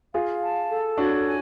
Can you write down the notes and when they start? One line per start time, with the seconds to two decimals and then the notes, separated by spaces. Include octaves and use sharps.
0.14 F4 G#4 F5
0.42 A5
0.70 A4
0.98 D4 F#4 C#5
1.25 G#5